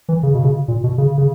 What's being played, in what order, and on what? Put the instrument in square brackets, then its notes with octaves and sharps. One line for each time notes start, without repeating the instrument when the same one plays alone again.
[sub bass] E3
C#3
B2
C#3
A#2
B2
C#3
C#3